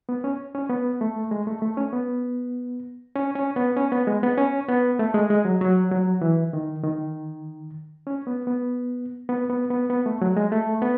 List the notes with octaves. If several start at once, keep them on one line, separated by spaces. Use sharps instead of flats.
B3
C#4
C#4
B3
A3
G#3
A3
A3
C#4
B3
C#4
C#4
B3
C#4
B3
G#3
B3
C#4
B3
A3
G#3
G#3
F#3
F#3
F#3
E3
D#3
D#3
C#4
B3
B3
B3
B3
B3
B3
A3
F#3
G#3
A3
B3